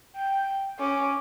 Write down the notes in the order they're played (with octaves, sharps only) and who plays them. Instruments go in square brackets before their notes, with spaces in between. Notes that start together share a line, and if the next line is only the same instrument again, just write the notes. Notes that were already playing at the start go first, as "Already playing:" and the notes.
[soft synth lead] G5
[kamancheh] C#4 [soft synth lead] D6